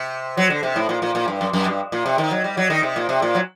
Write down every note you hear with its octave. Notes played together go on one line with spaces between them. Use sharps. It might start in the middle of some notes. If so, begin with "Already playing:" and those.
Already playing: C3
F#3
D3
C3
A2
A#2
A#2
A#2
G2
F#2
F#2
G2
A#2
C3
D#3
F#3
G3
F#3
D#3
C3
A#2
C3
A#2
F#3